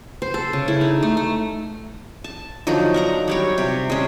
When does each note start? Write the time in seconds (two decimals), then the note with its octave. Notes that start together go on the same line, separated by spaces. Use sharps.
0.22 C5
0.34 A4
0.53 C#3
0.68 E4
0.81 D#4
1.03 A3
1.17 A3
2.24 A5
2.67 D3 F3 F#3 D#4
2.94 A#4 F#5 A#5
3.28 F#3 G3 C#5
3.58 C3
3.90 G#3 C#4